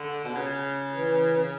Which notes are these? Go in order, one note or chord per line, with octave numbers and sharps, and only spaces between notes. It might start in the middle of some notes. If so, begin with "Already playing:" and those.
Already playing: D3
B2
C#3
E3